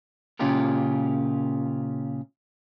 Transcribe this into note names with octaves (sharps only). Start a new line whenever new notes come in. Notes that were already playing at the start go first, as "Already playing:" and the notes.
A#2 C#3 C#4 F4 G4 A#4